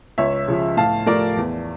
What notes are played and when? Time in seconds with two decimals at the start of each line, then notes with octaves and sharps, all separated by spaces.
0.18 C#2 C#5 E5
0.48 C#3 F3
0.77 A2 F5 A5
1.06 F3 A3 A#4 D5
1.37 E2